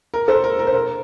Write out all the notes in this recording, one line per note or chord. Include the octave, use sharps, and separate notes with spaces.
A#4
A4 C5
A#4
A#4
C5
A#4